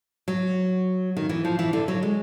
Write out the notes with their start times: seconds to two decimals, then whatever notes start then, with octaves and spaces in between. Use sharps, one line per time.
0.28 F#3
1.17 D#3
1.29 E3
1.45 F3
1.59 E3
1.73 D3
1.88 F#3
2.03 G#3